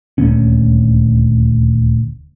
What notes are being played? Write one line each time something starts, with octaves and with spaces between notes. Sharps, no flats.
D#1 D2 C#4